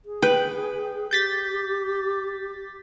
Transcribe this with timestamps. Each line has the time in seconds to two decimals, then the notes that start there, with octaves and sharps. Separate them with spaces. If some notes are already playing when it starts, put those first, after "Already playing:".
0.05 G#4
0.22 B4 G5
1.11 G4 G6 A6 B6